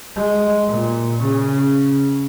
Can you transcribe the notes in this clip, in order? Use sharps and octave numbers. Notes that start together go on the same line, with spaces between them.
G#3
A#2
C#3